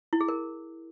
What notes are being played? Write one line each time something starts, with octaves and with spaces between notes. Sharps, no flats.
E4
G#4
A#4